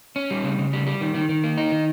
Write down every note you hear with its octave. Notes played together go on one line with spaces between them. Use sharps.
C#4
G3
C#3
C#3
G3
G3
D#3
D#3
D#3
A#3
D#4
D#3